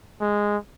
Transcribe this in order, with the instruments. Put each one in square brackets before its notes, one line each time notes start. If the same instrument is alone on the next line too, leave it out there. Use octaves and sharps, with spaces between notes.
[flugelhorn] G#3